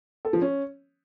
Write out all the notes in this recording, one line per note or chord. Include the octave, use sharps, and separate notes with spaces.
A4
F3
C#4